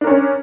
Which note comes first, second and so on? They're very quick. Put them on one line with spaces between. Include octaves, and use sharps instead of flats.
D4 A#4 C#4